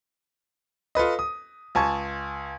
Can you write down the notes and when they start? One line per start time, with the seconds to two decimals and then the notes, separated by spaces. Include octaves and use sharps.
0.95 F4 A4 B4 D#5
1.19 D#6
1.75 C#2 G#5 A5 C#6 G#6